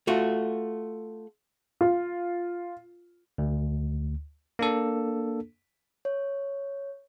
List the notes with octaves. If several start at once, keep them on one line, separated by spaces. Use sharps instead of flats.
A3 F4 F#4
F4
D2
A#3 D4 A4
C#5